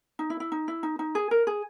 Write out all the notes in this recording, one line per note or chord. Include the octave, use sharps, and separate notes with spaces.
D#4
E4
E4
D#4
E4
D#4
D#4
G#4
A#4
G#4